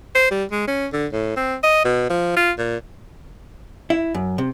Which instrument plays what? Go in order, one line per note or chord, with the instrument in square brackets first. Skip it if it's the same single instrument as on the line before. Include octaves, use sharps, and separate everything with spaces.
[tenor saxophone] C5
G3
G#3
C#4
D3
A2
C4
D#5
B2
F3
F4
A#2
[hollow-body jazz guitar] E4
F#2
C3